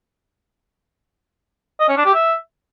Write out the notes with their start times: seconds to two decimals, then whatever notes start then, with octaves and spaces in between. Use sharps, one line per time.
1.80 D#5
1.89 C#4
1.97 D4
2.06 G4
2.14 E5